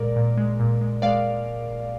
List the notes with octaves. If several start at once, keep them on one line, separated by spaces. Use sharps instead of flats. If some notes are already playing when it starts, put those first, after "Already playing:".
Already playing: A#2 G#3 A#4 D5
A#2
G#3
A#2
G#3
G#3 D5 F5